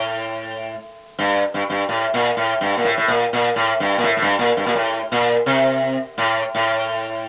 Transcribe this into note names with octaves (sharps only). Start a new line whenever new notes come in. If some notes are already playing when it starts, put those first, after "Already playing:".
Already playing: A2
G2
G2
G2
A2
A#2
A2
G2
A#2
A2
A2
A#2
A#2
A2
G2
A#2
A2
A2
G2
A#2
G2
A#2
A2
A#2
C3
A2
A2